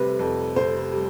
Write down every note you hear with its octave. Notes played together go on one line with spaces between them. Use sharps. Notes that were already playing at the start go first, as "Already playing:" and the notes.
Already playing: F1 C3 G3 B4
F2
F1 C5
G3